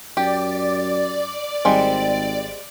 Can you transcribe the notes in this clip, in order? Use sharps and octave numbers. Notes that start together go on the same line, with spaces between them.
F#2 G4 D5
G#1 G3 G#3 C4